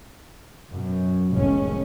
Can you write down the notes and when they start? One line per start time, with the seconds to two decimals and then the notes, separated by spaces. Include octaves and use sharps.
0.71 F#2 B2
1.31 F1 B1 A2 D#3 G#3 C#4